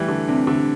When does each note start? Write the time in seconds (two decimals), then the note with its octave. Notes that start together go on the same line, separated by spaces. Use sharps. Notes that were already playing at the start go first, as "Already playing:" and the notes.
Already playing: E3 G3 A3 G4
0.08 D3
0.28 C3 D4
0.47 D3